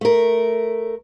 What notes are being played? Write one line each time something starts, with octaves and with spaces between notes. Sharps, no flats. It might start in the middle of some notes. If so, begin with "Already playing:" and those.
A3 A#4